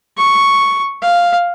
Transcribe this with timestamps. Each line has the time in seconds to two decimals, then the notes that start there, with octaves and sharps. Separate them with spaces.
0.17 C#6
1.02 F5